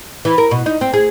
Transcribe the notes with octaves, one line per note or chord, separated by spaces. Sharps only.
E3
A#4
B2
D#4
C4
G#4